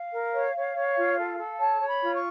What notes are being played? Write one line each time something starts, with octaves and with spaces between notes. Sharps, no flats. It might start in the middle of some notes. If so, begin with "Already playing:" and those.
Already playing: F5
A#4
C#5
C#5
C#5
F4
A4
A4
C#5 A5
C#5
B5
F4
C#6